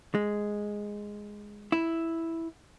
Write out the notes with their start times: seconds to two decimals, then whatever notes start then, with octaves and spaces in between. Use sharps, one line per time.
0.15 G#3
1.72 E4